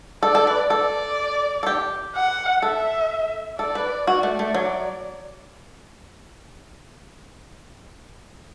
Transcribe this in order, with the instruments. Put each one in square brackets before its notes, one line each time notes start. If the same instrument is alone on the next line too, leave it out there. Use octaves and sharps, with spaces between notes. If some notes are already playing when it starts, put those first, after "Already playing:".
[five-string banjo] A4 [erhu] D5
[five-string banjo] A4
B4
[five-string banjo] A4 [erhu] D5
[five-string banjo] A4
G4
[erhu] F#5
[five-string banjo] A4 [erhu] E5
[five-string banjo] A4 [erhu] D5
[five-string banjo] B4
[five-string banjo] F#4 [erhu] D5
[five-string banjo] A3
A3
F#3